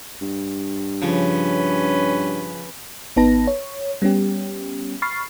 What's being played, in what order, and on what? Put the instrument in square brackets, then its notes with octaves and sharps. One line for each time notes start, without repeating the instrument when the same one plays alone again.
[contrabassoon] G2
[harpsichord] C#3 F3 [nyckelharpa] C#4 B4
[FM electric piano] G#1 B3 D#4 B4 A5 A#6
C#5
G3 B3 C#4 G4
B5 C#6 F6 A6 C7